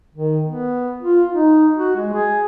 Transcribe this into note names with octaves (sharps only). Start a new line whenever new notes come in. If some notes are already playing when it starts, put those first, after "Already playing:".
D#3
B3
F4
D#4
F#4
G#3
G#4